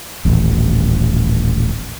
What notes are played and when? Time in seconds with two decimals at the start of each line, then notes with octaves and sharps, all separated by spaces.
0.25 D#1 A1